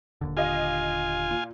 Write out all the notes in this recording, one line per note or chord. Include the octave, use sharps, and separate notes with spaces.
D#1 D#2 D3
F4 G4 D#5 F5 G#5
A#2